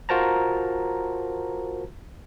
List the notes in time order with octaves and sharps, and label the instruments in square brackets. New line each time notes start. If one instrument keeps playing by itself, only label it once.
[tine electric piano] F4 F#4 A#4 C5 A5 A#5